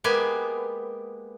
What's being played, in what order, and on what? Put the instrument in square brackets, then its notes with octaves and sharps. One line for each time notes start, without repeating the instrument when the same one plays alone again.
[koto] G#3 A#3 B3 G4 G#5